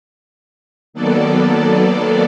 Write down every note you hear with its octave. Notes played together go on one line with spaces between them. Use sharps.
D#3 F#3 A#3 B3 A4 D5